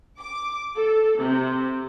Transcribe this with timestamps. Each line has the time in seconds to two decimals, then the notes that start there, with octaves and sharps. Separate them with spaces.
0.20 D6
0.76 A4
1.19 C3